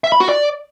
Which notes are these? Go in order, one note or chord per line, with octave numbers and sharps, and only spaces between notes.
E5
B5
F#4
D5